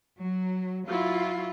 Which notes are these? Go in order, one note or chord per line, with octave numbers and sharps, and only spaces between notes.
F#3
F#3 E4 F4